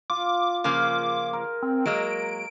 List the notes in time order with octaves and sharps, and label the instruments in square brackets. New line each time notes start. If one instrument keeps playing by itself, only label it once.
[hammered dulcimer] F4 [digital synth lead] D6
[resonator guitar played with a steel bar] C#3 F3 A#3 [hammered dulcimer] G#4 F5 [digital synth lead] D6
[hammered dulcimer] A#4
[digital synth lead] C4
[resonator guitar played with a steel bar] F#3 G#3 A#3 [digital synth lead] D7